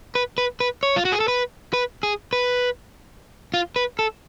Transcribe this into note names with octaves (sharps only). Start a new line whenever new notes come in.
B4
B4
B4
C#5
F4
F#4
G#4
A4
B4
B4
G#4
B4
F4
B4
A4